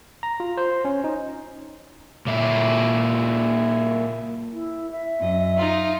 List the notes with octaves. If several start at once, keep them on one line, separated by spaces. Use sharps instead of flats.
A#5
F4
C5
C#4
D#4
A#2 E4
E4
E5
F#2 D#5
D#4 F4